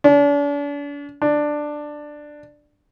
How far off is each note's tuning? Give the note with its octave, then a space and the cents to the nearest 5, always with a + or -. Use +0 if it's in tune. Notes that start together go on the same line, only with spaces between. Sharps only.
D4 -40
D4 +10